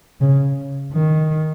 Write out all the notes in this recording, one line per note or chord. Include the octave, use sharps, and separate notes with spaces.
C#3
D#3